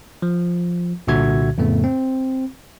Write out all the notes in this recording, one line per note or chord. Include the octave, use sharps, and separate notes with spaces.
F3
C2 A#2 D3 F#4 E5 G#6
F2 A2 C#3 A3 B3
C4